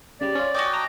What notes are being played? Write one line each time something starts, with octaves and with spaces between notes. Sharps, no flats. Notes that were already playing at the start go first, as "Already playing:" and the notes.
C#3 G3 D5
C#4 F4
F#4 C#5 D#5 G5 G#5 D6
A5 A#5 A#6